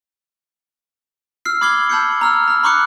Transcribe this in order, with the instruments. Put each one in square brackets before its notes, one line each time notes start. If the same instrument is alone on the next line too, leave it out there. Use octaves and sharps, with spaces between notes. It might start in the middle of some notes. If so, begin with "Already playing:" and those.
[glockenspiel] E6 F6 C7
B5 D6 G#6 C7 F#7 G7
A5 B5 E6 G6 C7 C#7
A#5 E6 F6
A#5 F6
A#5 B5 C#6 D6 F#6 C#7